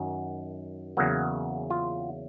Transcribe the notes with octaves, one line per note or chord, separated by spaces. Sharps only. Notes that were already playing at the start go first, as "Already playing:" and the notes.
Already playing: F#2 D#3 F#3
E2 C#3 F#3 A#3
F4